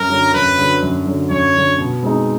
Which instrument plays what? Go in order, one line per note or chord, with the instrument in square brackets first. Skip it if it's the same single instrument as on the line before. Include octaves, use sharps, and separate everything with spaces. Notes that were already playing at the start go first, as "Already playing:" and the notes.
Already playing: [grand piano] F#2 [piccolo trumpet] A#4
[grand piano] D3 F#3
[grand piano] F#2 [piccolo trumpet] B4
[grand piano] D3 F#3
F#2
D3 F#3
[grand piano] F#2 [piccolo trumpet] C#5
[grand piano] D3 F#3
B2
G#3 C4 D#4